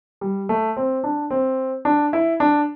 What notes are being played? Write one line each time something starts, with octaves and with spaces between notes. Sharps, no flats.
G3
A3
C4
D4
C4
D4
E4
D4